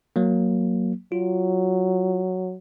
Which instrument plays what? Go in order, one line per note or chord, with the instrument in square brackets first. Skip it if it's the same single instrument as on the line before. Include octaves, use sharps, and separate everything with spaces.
[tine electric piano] F#3 A#3
[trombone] F#3 [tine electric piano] F4